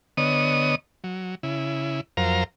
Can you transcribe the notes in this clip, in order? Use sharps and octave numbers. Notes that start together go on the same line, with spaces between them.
D3 B3 C#5 D#5 D#6
F#3
C#3 E4
F2 F#3 A#4 C5 F5 A#5